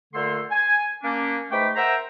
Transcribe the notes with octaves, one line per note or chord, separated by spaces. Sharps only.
A#2 D3 A3 A4 C6
G#5
A#3 C#4 D4
G#2 A3 B4 G5 B5 D6
A#4 C5 E5 F#5 G5 A#5